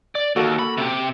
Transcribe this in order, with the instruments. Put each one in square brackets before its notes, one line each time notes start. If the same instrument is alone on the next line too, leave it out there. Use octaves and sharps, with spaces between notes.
[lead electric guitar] D5
[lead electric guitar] D#2 [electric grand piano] A#3 F#4 A4
[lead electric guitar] B5
C3 G4